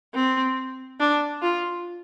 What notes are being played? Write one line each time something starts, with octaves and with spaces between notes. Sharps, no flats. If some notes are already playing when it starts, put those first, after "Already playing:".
C4
D4
F4